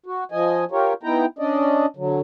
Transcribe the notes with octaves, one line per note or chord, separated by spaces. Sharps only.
F#4
F3 D#5 G#5
F4 G4 A#4 C#5
B3 D#4 E4 G5 A#5
C#4 D4 D5 D#5
D3 F#3